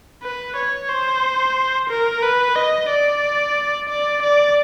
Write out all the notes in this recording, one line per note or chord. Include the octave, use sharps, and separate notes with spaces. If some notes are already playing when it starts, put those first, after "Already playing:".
B4
C#5
C5
A#4
B4
D#5
D5
D5
D5